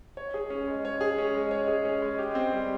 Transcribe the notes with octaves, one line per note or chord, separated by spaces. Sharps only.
C#5
G#4
C#4
G#3
C#5
G#4
C#4
G#3
C#5
G#4
C#4
G#3
G4
C4
G3